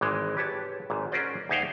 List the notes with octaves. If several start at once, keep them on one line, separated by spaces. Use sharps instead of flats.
G#1 E3 G#3
G4 B4 C#5 A5
G#1 G#2
C#4 F#4 A#4 C5 D5 D#5
D2 D#4 G#4 E5 F5 G5